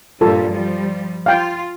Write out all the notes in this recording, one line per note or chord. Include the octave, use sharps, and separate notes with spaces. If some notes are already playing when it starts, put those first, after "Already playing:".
G2 A#2 G3 F4 A4
F3 G3
F4 F5 G5